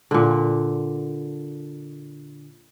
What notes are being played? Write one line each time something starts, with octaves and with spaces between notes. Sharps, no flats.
A#2 D3